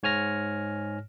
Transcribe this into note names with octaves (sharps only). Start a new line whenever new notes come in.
G#2 C#5 G#5 F6 A#6